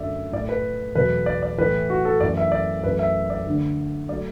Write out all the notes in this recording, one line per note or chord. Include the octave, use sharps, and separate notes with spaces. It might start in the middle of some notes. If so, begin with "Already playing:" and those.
Already playing: F#2 D3 F#3 A3 D5 E5
A2 A3 D5
B4
E2 B2 F#3 A3 B4
D5
D5
A2 E3 A3 B4
F#4
A4
F#2 E3 A3 D5
E5
D5
F#2 E3 A3 B4
E5
D5
D2 D3 A3
F#3 A3 D5